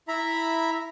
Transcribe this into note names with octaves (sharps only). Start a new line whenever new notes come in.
E4 E5 A#5 B5